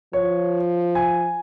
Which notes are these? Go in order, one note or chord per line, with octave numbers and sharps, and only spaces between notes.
F3 C#5
G#5